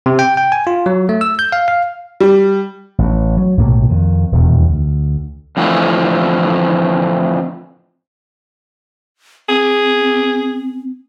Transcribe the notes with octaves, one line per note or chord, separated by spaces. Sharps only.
C3
G5
G5
G#5
F4
F#3
A3
E6
G6
F5
F5
G3
A1
F#3
B1 A2 C3 A#3
F2 D#3
D#1 E2 B2
D2
F2 A2 D3 E3 F3 A3
C4 G#4